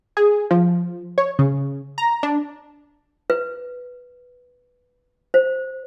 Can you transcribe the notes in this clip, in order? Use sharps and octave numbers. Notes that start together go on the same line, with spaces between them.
G#4
F3
C#5
C#3
A#5
D4
B4
C5